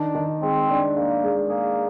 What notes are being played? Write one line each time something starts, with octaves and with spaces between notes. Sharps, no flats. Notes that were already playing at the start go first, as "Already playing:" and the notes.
Already playing: D#3 D4
D#3
G#3 C4
D4
A#3 D4
G#3
A#3 G#4